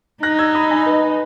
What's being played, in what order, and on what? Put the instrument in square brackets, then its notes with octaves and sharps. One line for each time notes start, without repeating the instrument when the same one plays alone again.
[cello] D#4 [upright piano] F#6 A#6
[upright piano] E6 G#6
B5 D#6
G#5 B5
B4 D#5